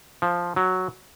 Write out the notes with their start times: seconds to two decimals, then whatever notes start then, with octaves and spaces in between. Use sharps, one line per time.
0.22 F3
0.56 F#3